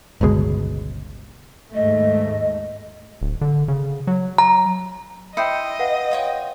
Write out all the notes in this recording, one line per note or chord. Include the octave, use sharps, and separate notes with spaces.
G1 C#2 B2 G#3
D#2 G#2 A3 D#5
D1
D3
C#3
F#3
A#5
E4 C5 D#5 G5 D#6 G6 C#7
B4 F5 F#5
F4 C#5 G5